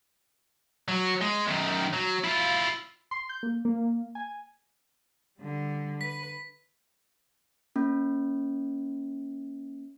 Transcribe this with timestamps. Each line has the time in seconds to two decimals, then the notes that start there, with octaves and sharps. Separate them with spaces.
0.88 F#3
1.21 G#3
1.47 F#2 D#3
1.93 F#3
2.24 E4 F4
3.11 C6
3.29 G6
3.43 A#3
3.65 A#3
4.15 G#5
5.39 D3 G3
6.01 B4 B6
7.76 A#3 C#4